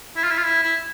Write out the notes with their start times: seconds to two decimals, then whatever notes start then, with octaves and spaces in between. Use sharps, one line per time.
0.16 E4
0.24 F4
0.31 E4
0.38 F4
0.46 E4
0.63 E4